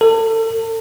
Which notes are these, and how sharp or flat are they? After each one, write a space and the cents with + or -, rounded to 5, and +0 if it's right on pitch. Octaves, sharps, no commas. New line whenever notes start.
A4 +35